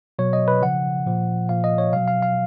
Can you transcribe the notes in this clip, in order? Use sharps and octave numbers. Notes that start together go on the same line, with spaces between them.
B2 F#3 C#5
D#5
B4
C#3 F3 F#5
A#2 F3
A#2 F3 F5
D#5
C#5
B2 F#3 F5
F5
F5